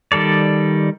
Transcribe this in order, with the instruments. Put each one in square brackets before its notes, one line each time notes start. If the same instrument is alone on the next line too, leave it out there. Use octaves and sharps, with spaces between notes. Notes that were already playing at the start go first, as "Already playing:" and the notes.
[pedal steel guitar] D#3 G3 A4 D5